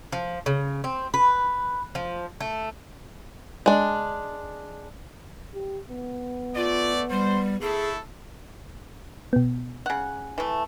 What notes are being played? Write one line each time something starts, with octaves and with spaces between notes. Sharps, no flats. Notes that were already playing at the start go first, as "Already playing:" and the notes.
F3
C#3
C4
B4
F3
A3
G#3 D4
G4
B3
A3 F4 D5
G3 C5
A3 E4 G#4 A4
B2 B3
C#3 F#5
E3 A3